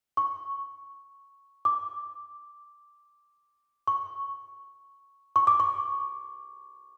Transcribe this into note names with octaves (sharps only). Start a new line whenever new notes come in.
C#6
D6
C#6
C#6
D6
C#6